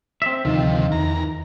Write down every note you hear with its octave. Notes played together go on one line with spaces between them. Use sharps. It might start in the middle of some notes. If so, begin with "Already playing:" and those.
C4 E5
D2 C3 D#3 F3
E2 A#5